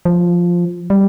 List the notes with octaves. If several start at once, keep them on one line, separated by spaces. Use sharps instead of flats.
F3
G3